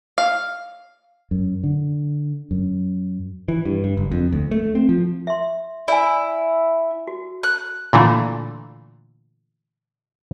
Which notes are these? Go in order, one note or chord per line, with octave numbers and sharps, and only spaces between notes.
F5
F#2
D3
F#2
E3
G2
G2
F#1
F2
D2
A3
C4
F3
E5 C6
E4 D5 G#5
F#4
F#6
A#2 D3 E3 A3